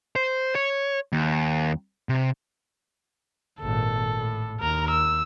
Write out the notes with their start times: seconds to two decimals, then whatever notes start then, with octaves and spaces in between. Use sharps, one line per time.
0.16 C5
0.55 C#5
1.13 D#2
2.09 C3
3.61 G#1 A#2 A4
4.17 A2
4.60 D#2 A#4 A#5
4.91 E6